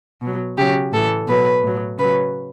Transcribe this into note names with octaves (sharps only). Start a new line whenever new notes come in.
B2 F#3
C#3 F#3 G4
A2 E3 A4
B2 F#3 B4
A2 F#3
C#3 F#3 B4